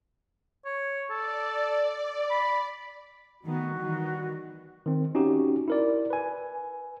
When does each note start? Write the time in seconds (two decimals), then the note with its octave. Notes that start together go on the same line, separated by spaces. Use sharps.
0.66 C#5
1.11 A4 D5
2.31 B5
3.43 D#3 A3 B3 F#4
3.77 D#3 E3 G3
4.86 D#3 C4
5.15 C#4 D#4 F#4 G4
5.68 E4 A#4 D5
6.10 B4 G#5